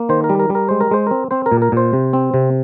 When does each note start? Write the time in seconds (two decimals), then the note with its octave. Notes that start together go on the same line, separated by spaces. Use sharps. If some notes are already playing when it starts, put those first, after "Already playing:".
Already playing: A#3
0.09 D#3 C5
0.24 A#4
0.29 G3
0.39 A#4
0.50 G3
0.55 A#4
0.69 G#3 C5
0.81 A#4
0.91 G#3 C5
1.07 C4 A#4
1.31 C4 C5
1.46 A#4
1.52 A#2
1.62 A#4
1.72 A#2 C5
1.93 C3
2.13 C4
2.34 C3